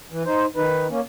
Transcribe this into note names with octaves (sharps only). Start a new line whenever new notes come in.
E3
D#4 C5
D#3 D#4 B4
A#3 C#4